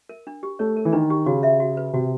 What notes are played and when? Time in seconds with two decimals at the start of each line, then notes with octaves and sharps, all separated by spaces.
0.09 A#4
0.27 D4
0.43 G4
0.59 A3 C#5
0.77 A#4
0.85 E3
0.92 D#3 D4
1.10 G4
1.26 C#3 F#4
1.43 E5
1.60 F#4
1.77 B4
1.93 C3 F#4